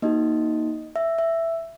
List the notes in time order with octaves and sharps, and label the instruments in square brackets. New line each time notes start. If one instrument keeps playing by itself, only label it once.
[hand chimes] A#3 D#4 F#4 D#5
E5
E5